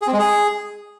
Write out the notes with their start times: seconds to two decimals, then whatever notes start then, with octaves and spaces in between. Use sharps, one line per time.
0.02 G#4
0.07 C4
0.13 G#3
0.19 G#4